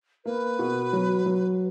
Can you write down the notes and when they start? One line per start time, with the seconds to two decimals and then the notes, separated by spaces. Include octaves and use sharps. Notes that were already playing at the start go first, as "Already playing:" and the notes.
0.25 A#3 B4
0.59 B2
0.93 F#3
1.26 F#3